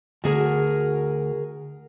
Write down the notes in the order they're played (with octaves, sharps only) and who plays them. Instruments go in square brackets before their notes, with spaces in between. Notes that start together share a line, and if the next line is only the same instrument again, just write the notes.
[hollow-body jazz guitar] D2 [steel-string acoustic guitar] F#4 G#4 A#4